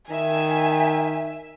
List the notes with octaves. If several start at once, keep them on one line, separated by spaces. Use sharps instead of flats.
D#3 E5 G#5